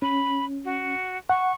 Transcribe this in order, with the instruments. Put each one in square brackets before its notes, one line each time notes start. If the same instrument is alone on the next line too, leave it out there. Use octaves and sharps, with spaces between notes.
[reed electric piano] C#4 [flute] B5
[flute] F#4
[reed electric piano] F#5 [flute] C#6